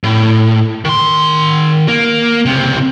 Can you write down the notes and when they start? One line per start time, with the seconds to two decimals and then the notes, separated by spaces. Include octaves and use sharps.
0.04 A2
0.85 D#3 C6
1.88 A#3
2.46 C#2 C3